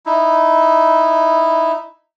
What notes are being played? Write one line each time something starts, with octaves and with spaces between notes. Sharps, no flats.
D#4 E4